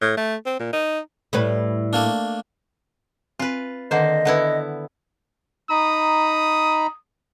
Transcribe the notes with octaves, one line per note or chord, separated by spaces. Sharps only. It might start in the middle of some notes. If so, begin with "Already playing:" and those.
A2
A3
C4
A#2
D#4
A2 G3 B4
A3 A#3 D4
C4 F4 B4
D3 D#3 A#3 C5 D#5 F#5
D3 B3 E4 B4 F#5
D#4 A#5 B5 D#6